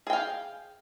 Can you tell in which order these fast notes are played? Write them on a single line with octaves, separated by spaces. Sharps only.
G#4 G5 F5